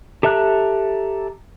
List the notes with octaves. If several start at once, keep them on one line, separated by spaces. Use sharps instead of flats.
G4 A4 E5 A#5 F#6